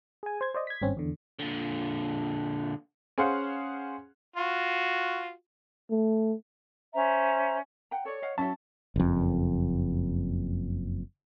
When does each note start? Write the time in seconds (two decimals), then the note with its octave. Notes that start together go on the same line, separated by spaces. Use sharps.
0.23 G#4 G#5
0.41 C5 G#6
0.54 C5 D5 D#5
0.67 G#6 B6
0.82 G#1 G2 C4 C#4
0.97 E2 D3
1.39 A#2 D3
3.18 C#4 G#4 C5 F5 F#5
4.36 F4 F#4
5.91 A3
6.94 C#4 C5 E5 A#5
7.91 F#5 G5 A#5
8.05 A4 C#5 D5
8.22 D#5 F5 F#5
8.38 F#3 C#4 E4 E5 A5
8.96 F#1 F2